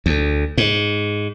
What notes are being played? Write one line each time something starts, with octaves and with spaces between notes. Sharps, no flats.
D2
G#2